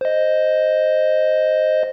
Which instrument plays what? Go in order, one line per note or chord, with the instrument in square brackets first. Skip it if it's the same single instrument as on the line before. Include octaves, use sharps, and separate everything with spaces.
[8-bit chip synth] C5 D#5